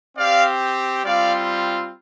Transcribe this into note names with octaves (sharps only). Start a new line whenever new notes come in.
C4 G4 D5 F5
G3 C4 F4 D5 F5